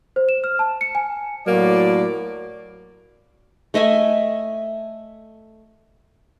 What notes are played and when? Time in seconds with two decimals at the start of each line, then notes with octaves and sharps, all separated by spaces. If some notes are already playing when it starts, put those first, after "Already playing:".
0.16 C5
0.29 E7
0.44 F6
0.59 A5
0.81 C#7
0.95 G#5
1.47 A2 F#3 A#3 D5
3.74 A3 D#5 E5 G#5